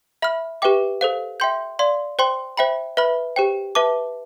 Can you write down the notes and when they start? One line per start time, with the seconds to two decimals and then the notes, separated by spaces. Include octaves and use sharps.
0.22 E5 B5 F6
0.62 G4 B4 E5 G5 D6
1.01 A4 C5 F5
1.40 E5 G5 C6 G6
1.79 D5 F5 C6
2.19 C5 G5 C6
2.57 C5 E5 G5 B5
2.97 B4 E5 B5 F6
3.36 G4 C5 G5
3.75 B4 E5 A5 D6